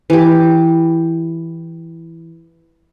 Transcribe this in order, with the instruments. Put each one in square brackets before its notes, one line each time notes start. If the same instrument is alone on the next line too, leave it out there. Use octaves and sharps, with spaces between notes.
[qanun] E3 G4